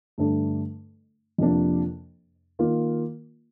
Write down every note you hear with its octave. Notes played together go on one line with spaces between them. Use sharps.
G2 D3 A3 D4 A4
F2 C3 F3 A#3 D4
D#3 A#3 F4 A#4